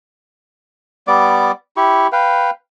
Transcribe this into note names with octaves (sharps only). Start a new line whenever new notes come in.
G3 B3 D5 D6
E4 G4 C#6
B4 F5 G5